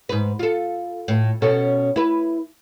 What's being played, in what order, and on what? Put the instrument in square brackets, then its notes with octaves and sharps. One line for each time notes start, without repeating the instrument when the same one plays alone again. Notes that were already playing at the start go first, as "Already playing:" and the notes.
[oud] G#2 B4
F4 A4
A2
B2 C#4 A4
E4 B4